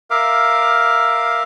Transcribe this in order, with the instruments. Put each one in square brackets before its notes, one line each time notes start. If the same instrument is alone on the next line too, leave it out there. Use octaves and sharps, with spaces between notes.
[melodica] A#4 E5 F5 D6